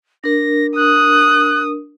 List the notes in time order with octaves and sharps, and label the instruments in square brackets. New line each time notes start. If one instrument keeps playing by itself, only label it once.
[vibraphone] D4 A#4 [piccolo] A#6
[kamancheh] D#6 [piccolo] F#6